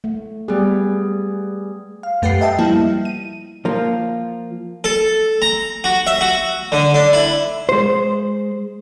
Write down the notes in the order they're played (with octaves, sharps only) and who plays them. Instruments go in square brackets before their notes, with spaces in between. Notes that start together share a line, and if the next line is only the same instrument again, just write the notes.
[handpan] A3
[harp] G3 B3 [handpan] G#4
[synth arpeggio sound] F5
F#2 A3 G4 B4 F#5 C7
D#5 E5 G5 A5
F3 G3 A#3 E4
D#7
[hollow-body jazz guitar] F3 A#3 F4
[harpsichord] A4
A#5
F#4
E5
F#4
D3
D4
E4
[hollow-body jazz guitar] G#3 C5